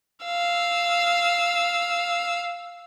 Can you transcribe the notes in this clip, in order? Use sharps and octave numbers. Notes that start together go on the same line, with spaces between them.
F5 E6